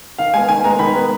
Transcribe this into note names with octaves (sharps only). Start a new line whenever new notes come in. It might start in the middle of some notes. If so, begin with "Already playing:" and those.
D#3 F5
G#3 B3 G#5
D#3 G#5
G#3 B3 A#5
D#3 B5
G#3 B3